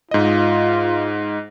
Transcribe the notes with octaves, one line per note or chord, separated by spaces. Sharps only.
G#2 F4 D#5